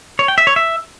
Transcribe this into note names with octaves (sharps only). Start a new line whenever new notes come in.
C#5
G5
E5
C#5
E5